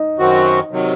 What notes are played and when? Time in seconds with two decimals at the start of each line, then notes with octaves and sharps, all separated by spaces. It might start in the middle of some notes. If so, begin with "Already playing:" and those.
Already playing: D#4
0.18 F#2 D#3 F#3 C4 F#4
0.71 C3 D#3 F#3